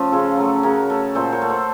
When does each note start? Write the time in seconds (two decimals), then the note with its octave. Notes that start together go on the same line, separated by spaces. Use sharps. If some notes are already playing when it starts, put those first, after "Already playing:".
Already playing: F3 A3 C#4
0.12 C#3 F4 A4
0.38 F#3 A3
0.63 C#3 F#4 A#4
0.90 A3
1.15 A#2 A4 C5
1.32 A#4 C#5
1.42 A3
1.50 A4 C5